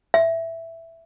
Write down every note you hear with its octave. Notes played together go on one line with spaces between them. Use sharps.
E5